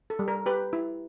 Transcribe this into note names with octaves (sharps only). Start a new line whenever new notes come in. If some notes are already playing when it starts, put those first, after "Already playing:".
A4
G3
A#4
G4 B4
E4